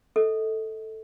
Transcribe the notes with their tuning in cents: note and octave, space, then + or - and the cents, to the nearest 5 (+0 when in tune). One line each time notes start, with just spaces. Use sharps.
A4 +0 D#5 +40